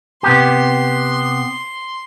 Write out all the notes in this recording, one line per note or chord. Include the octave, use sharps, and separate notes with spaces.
C3 B3 G4 C6